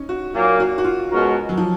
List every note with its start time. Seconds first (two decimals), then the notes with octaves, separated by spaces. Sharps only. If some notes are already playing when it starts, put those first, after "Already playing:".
Already playing: C#4 D#4
0.09 F#4
0.34 A#2 F#3 A#3 F#4
0.60 F#4
0.78 F#4
0.84 F4
1.11 B2 G#3 C#4 F#4 A#4
1.49 F#3
1.58 F3